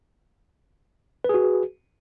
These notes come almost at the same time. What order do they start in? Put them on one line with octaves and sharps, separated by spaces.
B4 G#4 F#4